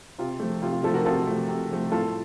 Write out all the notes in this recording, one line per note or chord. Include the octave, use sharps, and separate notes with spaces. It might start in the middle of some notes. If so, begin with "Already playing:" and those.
C3 F4
F3 A3
C3 F4
F4
F3 A3 F4 A4
F#4 A#4
C3 F4 A4
F3 A3
C3
F3 A3
A2 F4 A4